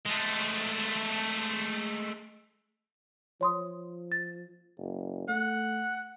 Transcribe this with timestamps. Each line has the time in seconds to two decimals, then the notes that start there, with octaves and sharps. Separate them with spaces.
0.06 G#3 A3
3.41 F3 C#5 C6 D#6
4.12 A6
4.78 F#1
5.28 A3 F#5